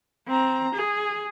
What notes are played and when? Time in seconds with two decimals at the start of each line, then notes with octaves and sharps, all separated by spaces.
0.28 C4 A#5
0.75 G#4